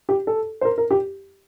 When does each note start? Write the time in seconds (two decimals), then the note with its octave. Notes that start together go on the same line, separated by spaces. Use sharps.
0.09 G4
0.27 A4
0.61 C5
0.65 A#4
0.78 A#4
0.91 G4